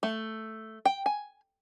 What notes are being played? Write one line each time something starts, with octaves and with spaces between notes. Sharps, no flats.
A3
G5
G#5